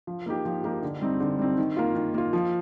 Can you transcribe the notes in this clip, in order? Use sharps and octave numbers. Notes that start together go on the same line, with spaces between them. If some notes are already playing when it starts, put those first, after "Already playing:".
F3
A#3 D#4 G4
F3
A#3 D#4 G4
D3
G3 C4 D#4
D3
G3 C4 D#4
D#3
A#3 F4
D#3
A#3 F4
F3